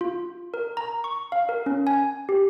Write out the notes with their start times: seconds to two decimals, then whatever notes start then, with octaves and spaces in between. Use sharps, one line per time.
0.01 F4
0.54 A#4
0.77 A#5
1.04 C#6
1.32 F5
1.49 A#4
1.66 C#4
1.87 G#5
2.29 G4